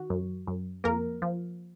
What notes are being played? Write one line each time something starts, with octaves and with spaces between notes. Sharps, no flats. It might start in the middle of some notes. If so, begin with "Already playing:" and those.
Already playing: D#3 F#4
F#2
F#2
F2 A#3 A#4
F3